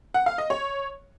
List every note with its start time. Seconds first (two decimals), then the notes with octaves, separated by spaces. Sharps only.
0.14 F#5
0.26 F5
0.38 D#5
0.50 C#5